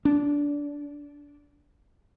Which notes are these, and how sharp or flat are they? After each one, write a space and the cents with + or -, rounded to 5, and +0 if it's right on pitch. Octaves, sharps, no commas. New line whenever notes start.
D4 -20